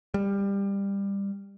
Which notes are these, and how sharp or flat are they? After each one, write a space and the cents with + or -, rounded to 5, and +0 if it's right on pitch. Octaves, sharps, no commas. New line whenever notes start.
G3 +20